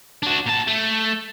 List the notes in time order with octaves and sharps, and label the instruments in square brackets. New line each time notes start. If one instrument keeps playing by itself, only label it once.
[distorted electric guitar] D4 F#4
A#2 A5
A3